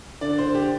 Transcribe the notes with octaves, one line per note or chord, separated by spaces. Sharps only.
D3 D5
C5
G4